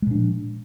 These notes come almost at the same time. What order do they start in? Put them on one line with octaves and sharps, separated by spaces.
G#3 A#2 D4 F3